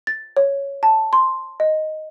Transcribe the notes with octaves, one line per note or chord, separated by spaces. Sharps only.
A6
C#5
A5
C6
D#5